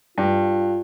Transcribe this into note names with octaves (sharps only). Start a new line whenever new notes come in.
G2 F4